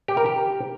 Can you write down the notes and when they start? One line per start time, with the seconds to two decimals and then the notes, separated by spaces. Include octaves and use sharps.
0.08 G4
0.17 A#4
0.26 G4